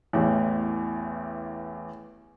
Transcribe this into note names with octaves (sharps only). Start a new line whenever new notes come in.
A1 E2